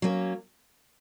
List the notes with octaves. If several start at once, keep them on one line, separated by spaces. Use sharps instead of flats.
F#3 A#3 C#4